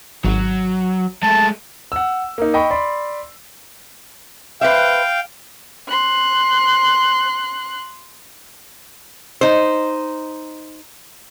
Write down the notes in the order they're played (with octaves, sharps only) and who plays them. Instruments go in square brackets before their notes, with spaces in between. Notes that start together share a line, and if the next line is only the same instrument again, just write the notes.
[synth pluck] G#1 [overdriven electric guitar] F#3
[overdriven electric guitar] G#3 A3 [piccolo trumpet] A5
[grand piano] F#5 E6
A#3 D#4
D#5 G5 B5 C#6
D5 B5 C6
[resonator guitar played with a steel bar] B4 C5 E5 [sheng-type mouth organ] F5 G5
[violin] C6 F#6
[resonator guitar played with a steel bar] D#4 C5